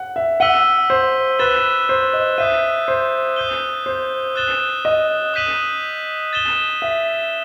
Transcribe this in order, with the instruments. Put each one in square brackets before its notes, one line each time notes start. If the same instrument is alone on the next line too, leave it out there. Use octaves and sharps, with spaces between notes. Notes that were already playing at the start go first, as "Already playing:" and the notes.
Already playing: [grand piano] F#5
E5
[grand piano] F#5 [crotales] E6 B6 D#7 G7
[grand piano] C5
[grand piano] B4 [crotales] F#6 A6 E7 G7
[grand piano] C5
D#5
[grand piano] E5 [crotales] D#6 G6 D#7
[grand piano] C5
[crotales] D#6 G6 D#7 G7
[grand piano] C5
[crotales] D#6 F#6 A6 E7 G7
[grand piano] D#5
[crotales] D#6 G6 B6 D#7 F#7
A6 E7 G7
[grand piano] E5